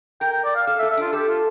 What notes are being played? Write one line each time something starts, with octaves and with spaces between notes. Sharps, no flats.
A#4 G5
G5
D5
F5
A4 F5
E5
A4
E5
D4 F4
G4 A4
F4